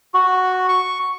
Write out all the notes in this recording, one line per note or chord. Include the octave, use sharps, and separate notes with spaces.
F#4
C#6